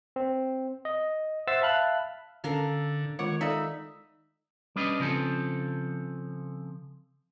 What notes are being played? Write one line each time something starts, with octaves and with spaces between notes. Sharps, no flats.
C4
D#5
C5 E5 F#5 E6 A6 C7
E5 F5 A5 B5 F6 F#6
D3 C#4 D4 A4 A#4 F5
D#3 G#3 F4 C#5 F#5
D#4 A4 D5 E5 F5 B5
G3 C#4 D4 B4 D#5
C#3 F3 C4 A4